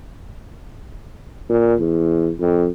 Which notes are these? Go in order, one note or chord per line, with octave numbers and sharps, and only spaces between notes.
A#2
E2
F2